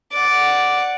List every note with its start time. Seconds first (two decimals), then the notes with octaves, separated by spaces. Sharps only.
0.12 D5 F#5